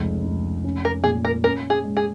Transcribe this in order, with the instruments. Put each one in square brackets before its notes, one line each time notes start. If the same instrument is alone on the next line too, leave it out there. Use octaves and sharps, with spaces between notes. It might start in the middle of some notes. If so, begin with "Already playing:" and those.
Already playing: [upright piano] F1 C#2
F1
C#4
[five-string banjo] A#4
[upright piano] A#2 [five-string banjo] G#4
[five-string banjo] A#4
[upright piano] C#4 [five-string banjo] A#4
[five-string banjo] G#4
[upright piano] G#3
[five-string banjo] G#4